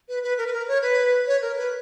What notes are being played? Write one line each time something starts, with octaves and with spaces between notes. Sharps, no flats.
B4
B4
A#4
B4
A#4
C#5
B4
C#5
A#4
B4